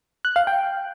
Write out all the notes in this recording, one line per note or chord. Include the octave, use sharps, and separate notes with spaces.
F#6
F5
G5